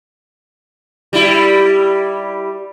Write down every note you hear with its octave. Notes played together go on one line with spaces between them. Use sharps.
G3 E4